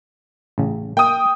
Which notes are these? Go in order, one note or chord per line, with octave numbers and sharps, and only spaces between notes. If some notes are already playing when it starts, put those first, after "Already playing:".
A1 C#3
A#3 G5 D#6